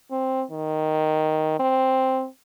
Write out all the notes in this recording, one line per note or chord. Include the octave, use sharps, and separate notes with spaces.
C4
D#3
C4